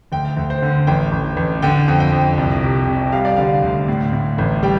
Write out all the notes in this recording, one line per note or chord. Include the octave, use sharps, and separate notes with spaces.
D2 G5
D2
C5
D3
A1 G5
A1
A1
D3 G5
F2
G5
F2
C2
C3
C3
G3 F5
D5
D3 F5
D2
A2
A2
A1
G3 G5